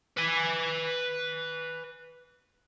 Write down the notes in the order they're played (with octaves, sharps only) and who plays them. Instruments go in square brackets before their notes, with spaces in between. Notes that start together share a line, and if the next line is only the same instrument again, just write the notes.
[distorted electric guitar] B4 G#5